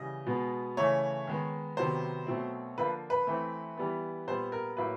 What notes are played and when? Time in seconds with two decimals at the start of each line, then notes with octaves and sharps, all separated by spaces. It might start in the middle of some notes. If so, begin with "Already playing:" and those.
Already playing: C#3 E3 G3 D#5
0.27 B2 G#3 B3
0.77 C#3 E3 A3 C#5
1.27 D#3 G#3 B3
1.77 C3 D#3 F#3 B3 C5
2.27 B2 F#3 A3 C4
2.78 D3 F3 A#3 B4
3.10 B4
3.27 E3 A3 C4
3.77 E3 G3 B3
4.27 A#2 G3 B3 C5
4.52 A#4
4.77 A2 F#3 A#3 B4